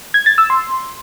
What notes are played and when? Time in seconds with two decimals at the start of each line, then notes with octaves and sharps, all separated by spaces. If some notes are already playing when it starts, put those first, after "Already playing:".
0.14 G#6
0.26 A6
0.38 E6
0.50 C6